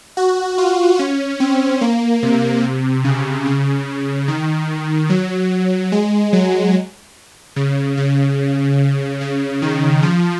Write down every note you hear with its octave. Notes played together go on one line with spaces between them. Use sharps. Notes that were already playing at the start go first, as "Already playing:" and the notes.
F#4
F4
C#4
C4
A#3
C3
C#3
C#3
D#3
F#3
G#3
F#3
C#3
C#3
C#3
D#3
F3